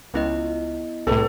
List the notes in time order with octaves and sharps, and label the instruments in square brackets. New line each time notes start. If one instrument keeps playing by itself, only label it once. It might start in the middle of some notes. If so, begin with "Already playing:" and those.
[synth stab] C#2 [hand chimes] B3 E4 D#5
[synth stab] C2 A2 [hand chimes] G#4 B4 [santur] A4